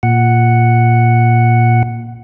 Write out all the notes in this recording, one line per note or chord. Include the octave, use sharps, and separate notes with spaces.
A#2 F#5